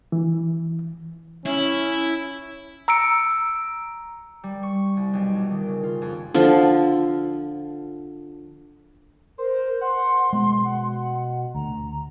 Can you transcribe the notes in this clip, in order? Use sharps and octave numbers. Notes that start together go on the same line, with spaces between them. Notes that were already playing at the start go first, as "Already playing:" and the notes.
E3
C#4 E4
A#5 E6 C#7 D7
G3
C#6
C2
B1
A#1
D#3
C#3
F4
F2
D3 F3 F4
A#4 C5
F#5 C6
B2 G#3
F#5
D2 A#5